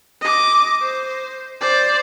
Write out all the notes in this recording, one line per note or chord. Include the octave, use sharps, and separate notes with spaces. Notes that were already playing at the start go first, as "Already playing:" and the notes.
D#5 D6
C5
C5 D5